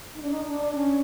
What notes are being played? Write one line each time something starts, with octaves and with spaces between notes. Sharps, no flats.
D#4
D4
D#4
D4
C#4